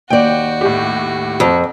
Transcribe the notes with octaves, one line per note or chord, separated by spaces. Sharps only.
D#2 F#4 D5 G5
A2 G4
F2